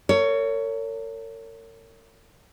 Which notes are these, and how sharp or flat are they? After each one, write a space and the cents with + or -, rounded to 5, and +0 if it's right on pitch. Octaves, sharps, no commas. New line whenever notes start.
A#4 -40 C#5 +15